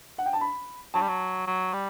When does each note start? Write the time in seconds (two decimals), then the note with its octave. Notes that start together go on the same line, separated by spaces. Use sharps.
0.18 F#5
0.26 G5
0.33 A5
0.41 B5
0.94 F#3 A5
1.01 G3
1.08 F#3
1.47 F#3
1.73 G3